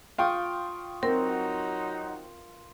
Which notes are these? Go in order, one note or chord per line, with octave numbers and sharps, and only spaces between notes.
F4 F5 G5 C#6 D#6
F#3 C4 D#4 A#4 F#5